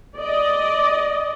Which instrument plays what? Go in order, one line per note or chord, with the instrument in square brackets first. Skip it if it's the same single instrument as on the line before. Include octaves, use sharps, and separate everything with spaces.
[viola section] D5 D#5